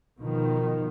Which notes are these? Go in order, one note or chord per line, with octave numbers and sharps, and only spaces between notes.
B2 D#3 F3